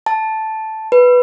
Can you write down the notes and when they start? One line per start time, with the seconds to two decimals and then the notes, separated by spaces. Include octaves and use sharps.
0.06 A5
0.92 B4